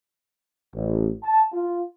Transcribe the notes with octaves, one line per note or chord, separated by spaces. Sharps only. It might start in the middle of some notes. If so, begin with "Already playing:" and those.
A1
A5
F4